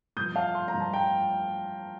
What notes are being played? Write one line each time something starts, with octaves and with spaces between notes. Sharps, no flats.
G2 F3 D#6 G6
F5 A5
C6
A#5
G2 F3
A5
G5 A#5